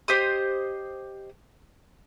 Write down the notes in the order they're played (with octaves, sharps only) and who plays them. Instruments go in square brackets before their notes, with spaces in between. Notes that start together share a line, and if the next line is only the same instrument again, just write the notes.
[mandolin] G4 C5 D#5 D#6